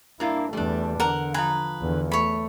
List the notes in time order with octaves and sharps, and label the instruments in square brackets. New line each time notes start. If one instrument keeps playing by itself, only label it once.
[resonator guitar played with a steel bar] G2 A#3 D4 [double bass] E4
[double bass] E2 A3 [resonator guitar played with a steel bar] G3 D4
[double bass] D3 [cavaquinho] A#4 F#5
[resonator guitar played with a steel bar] F3 A#5 [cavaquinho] B4 G#5
[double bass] E2 D3
[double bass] A3 [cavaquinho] C#5 B5